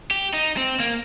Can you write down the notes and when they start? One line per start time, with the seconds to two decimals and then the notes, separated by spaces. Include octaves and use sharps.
0.11 G4
0.34 D#4
0.57 C4
0.80 A#3